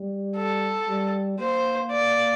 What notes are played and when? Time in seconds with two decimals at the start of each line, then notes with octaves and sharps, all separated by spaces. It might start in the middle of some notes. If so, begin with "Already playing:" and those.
Already playing: G3
0.36 A4
0.88 G3
1.39 A#3 C5
1.92 D5